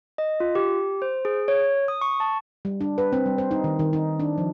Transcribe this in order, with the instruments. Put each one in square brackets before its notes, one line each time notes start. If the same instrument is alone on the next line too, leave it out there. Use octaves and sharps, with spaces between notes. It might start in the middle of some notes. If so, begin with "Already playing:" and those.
[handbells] D#5
F4
G4
C5
G#4
C#5
D#6
C#6
A5
[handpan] G3
D4
B4
C4
G3
C5
D#4
D#3
D#3
D#4
D4
F3